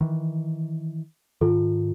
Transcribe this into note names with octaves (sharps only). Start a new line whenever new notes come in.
D#3 E3
G#2 D#3 F4 A4